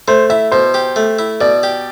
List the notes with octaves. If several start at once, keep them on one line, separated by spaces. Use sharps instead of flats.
A3 C5
E4 E5
B2 C5
G4
A3
E4
B2 D5
G4